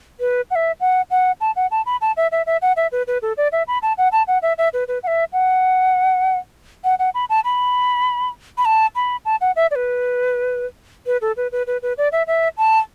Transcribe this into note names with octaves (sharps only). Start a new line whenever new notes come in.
B4
F#5
E5
F#5
F#5
A5
F#5
A5
B5
A5
E5
E5
E5
F#5
E5
B4
B4
A4
D5
E5
B5
A5
F#5
A5
F#5
E5
E5
B4
B4
F#5
E5
F#5
F#5
F#5
B5
A5
B5
B5
A5
B5
A5
F#5
E5
D5
B4
B4
A4
B4
B4
B4
B4
D5
E5
E5
A5